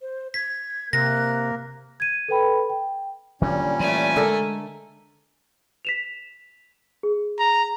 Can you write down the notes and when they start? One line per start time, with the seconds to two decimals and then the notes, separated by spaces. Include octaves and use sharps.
0.01 C5
0.34 G#6 B6
0.93 C3 A#3 A#4 F#6 A#6
2.00 G#6 D#7
2.28 A4 B4 G5 B5
2.70 G5
3.41 A#2 D3 F#3 G3 C#4 D4
3.80 E3 A3 G#5
4.16 D3 G#3 A4 A#4
5.85 B6 E7 F7
7.03 G#4
7.39 A#5